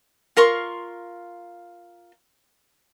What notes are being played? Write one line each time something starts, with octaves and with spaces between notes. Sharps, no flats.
F4 A#4 C6 C#6